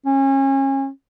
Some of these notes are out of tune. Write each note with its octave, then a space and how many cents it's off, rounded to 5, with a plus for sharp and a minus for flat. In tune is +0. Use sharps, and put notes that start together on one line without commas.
C#4 -30